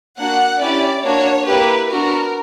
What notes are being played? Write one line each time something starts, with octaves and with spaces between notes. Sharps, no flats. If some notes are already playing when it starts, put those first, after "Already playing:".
A#3 D4 F#4 F#5
C#4 E4 G4 D5
A#3 D4 F#4 C#5
A#3 E4 G4 B4
B3 D4 F#4 A#4